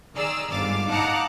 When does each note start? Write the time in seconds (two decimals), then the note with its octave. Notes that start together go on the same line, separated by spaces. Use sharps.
0.15 D#3 G#4 D5 A#5 E6 F6
0.50 G1 G#2 F5 D6 A6
0.88 D#4 F5 F#5 A5 A#5 D6